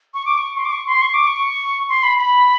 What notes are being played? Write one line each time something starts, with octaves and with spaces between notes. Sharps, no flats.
C#6
D6
C#6
C6
D6
C#6
C6
C#6
D6
C#6
C6
B5
B5